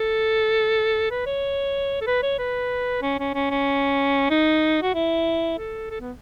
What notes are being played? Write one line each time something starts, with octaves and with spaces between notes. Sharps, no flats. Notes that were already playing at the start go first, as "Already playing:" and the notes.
Already playing: A4
B4
C#5
A4
B4
C#5
B4
C#4
C#4
C#4
C#4
D#4
F#4
E4
A4
A4
B3